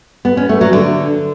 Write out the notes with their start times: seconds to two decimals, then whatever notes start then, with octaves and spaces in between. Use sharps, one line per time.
0.25 B3
0.37 C#4
0.49 A3
0.61 F#3
0.73 D3